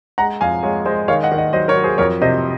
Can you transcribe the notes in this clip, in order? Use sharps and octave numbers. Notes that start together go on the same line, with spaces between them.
G#3 F#5 A#5
F2 F5 G#5
G#3 C#5 F5
G#3 C5 D#5
D#3 C#5 F5
D#5 F#5
D#3
D#5 F#5
F#3 C5 D#5
A#4 C#5
F#3
G#4 C5
F2 A#4 C#5
C3 C5 D#5